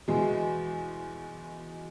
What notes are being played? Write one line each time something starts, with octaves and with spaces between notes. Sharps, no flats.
E2 B2 G#3